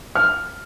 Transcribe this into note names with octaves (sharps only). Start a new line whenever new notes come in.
F6